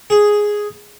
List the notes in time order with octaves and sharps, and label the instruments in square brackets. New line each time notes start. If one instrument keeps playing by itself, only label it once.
[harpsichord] G#4